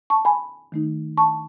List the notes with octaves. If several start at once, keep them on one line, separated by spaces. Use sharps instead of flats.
A5 C#6
G#5 B5
D#3 A3 D#4
A5 C#6